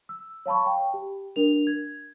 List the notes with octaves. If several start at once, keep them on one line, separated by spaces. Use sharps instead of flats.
E6
C#5 F5 A5 B5 C#6
G5
G4
D4 A#4 F7
G#6